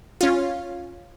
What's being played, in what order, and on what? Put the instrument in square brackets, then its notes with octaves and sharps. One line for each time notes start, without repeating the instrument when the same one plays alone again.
[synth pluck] C#4 F4